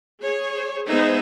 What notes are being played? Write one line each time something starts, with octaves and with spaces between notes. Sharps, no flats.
G#4 C#5
G#3 B3 D#4 G#4 C5 E5